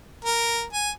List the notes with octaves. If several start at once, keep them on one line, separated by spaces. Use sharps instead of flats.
A#4
G#5